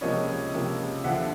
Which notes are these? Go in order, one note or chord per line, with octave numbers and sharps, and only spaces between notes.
C#2 C3 F3 A#3 C#4 C#5 D#5
C#2 C3 F3 A#3 C#4
D#2 D3 F3 E5 F#5